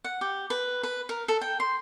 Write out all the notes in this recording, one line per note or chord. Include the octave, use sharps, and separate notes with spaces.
F#5
G4
B4
B4
A#4
A4
G5
C6